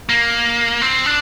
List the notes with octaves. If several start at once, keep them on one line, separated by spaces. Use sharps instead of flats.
A#3
C4
D4